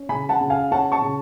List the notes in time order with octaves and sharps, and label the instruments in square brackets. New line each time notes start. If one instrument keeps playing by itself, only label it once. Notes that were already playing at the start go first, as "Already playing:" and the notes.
Already playing: [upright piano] C#4
C#3 G#5 B5
F#5 A5
C#3
F5 G#5
C#4 F#5 A5
A5 C#6
C#3